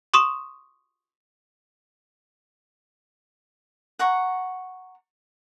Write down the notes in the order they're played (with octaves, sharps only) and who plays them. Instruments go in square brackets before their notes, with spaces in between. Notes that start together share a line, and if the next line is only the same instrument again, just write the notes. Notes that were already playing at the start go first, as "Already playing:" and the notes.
[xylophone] C6 C#6 D#6 E7
[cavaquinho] F#5 A#5 C#6